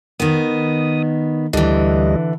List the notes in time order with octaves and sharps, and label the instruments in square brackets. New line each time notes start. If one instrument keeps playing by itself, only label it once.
[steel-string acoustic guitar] D#3 B3 [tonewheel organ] D#6
[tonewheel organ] D2 G3 D#5 [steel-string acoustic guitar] D3 E3